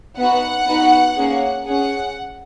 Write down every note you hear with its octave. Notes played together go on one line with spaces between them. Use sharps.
B3 D#4 F#4 F#5
B3 D#4 F#4
A#3 C#4 G#4
C#4 G#4 F#5